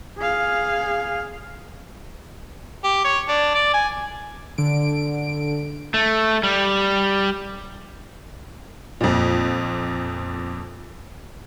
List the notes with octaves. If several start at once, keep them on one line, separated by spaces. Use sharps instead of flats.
G#4 F5
G4
C#5
D4
D5
G#5
D3 D7
A3
G3
F2 A#2